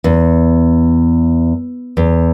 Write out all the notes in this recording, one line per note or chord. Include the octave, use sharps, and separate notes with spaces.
E2
E2